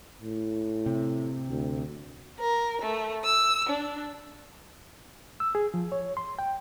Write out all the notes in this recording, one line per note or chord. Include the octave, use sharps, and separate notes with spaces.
A2
C3
D2
A#4
A3
E6
D4
E6
G#4
F3
C#5
C6
G5